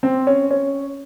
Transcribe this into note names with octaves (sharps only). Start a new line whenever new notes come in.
C4
C#4
C#4